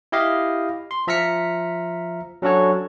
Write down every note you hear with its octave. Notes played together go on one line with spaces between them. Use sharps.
E4 G4 D#5 F5
C6
F3 E5 A#5 F6 B6 C#7
F#3 C#4 D4 F#4 A4 C#5